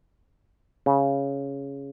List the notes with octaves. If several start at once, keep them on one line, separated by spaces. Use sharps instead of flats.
C#3